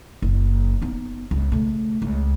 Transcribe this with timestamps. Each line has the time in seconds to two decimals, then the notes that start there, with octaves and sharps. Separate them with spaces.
0.22 F#1
0.82 B3 D#4
1.31 C#2
1.52 C#3 A3
2.02 C#2